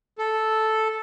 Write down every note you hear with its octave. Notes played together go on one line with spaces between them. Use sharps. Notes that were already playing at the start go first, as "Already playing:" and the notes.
A4